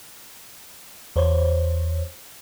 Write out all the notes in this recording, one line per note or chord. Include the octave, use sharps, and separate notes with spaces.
E2 C5 C#5